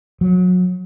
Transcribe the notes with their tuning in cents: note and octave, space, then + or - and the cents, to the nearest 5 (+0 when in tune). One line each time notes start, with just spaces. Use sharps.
F#3 -30